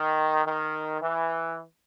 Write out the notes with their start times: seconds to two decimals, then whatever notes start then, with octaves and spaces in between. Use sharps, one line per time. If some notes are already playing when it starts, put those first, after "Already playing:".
Already playing: D#3
0.45 D#3
1.01 E3